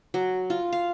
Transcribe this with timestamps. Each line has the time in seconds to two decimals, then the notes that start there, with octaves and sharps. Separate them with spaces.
0.14 F#3
0.50 F4
0.73 F5